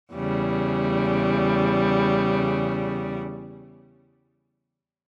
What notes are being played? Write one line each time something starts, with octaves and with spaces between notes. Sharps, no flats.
E2 C#3 G3